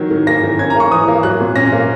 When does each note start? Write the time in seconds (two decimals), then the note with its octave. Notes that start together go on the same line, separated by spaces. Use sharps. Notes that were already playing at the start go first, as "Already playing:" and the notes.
Already playing: D#3 F#3
0.11 D#3
0.27 A#3 A#6
0.43 D#3
0.59 C#4 G#6
0.70 A#5
0.76 A#3 C#6
0.91 E3 D#6
1.08 A#3
1.23 F#3 F#6
1.40 A#2
1.56 C#4 A#6
1.73 A#3